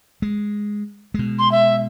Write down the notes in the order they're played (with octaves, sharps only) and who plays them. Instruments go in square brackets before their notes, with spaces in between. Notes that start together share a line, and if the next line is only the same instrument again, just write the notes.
[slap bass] G#3
B2 G#3
[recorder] C6
E5